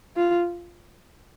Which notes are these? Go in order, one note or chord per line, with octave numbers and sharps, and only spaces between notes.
F4